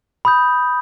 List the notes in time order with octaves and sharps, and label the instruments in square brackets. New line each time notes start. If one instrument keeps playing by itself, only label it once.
[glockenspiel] B5 D#6 G6